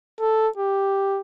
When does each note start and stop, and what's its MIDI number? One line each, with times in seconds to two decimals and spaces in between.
0.20 0.48 69
0.57 1.21 67